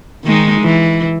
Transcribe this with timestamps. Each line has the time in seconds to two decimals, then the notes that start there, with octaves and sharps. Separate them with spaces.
0.25 D#3 G#3 D#4
0.61 E3